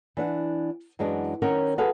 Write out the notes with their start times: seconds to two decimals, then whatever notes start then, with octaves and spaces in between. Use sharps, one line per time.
0.17 E3 D4 F#5
0.99 F#2 E3 G#3 D4 F#4
1.42 D#3 C#4 A#4 C#5 F#5
1.78 F#4 G#4 A4 B4 F5 F#5